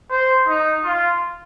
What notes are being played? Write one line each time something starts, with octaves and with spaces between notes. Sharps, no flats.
C5
D#4
F4